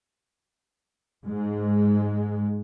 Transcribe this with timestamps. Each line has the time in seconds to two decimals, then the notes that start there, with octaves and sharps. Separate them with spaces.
1.24 G#2 G#3